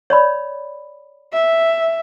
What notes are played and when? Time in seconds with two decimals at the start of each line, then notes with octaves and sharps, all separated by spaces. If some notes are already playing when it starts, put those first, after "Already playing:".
0.10 C#5 D5 B5
1.33 E5